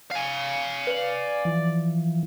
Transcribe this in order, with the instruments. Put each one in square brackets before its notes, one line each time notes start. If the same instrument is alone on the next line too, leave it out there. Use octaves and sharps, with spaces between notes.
[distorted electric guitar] F5 G#5
[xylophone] B4 F#7 [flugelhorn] D5
[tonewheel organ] E3 F3